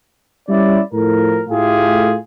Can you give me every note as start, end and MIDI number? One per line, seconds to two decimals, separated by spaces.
0.49 0.80 55
0.49 0.80 61
0.49 0.80 64
0.49 0.80 74
0.93 1.44 45
0.93 1.44 53
0.93 1.44 70
1.49 2.16 45
1.49 2.16 57
1.49 2.16 65
1.49 2.16 67
1.49 2.16 68